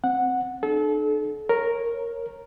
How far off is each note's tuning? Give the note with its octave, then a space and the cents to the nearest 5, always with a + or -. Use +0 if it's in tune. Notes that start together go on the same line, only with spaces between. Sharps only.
C4 +0 F#5 -10
D4 +45 A4 -35
A#4 +0 C#5 -15